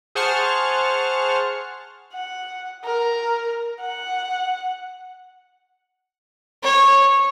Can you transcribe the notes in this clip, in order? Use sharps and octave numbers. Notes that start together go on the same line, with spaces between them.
G#4 C5 F#5 A5 C#6 F6
F#5
A#4
F#5
C#5